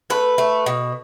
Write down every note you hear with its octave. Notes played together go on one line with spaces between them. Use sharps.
A3 B4
A3
B2